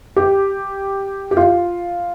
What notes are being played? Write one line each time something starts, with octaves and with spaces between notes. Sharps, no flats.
G4
G4
F4